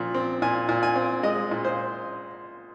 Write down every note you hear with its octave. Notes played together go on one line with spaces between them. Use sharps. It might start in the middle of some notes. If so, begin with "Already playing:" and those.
Already playing: A#2 F3
C4
A#2 G#5
A#2
G#5
C4
G#3 D#5
A#2
C5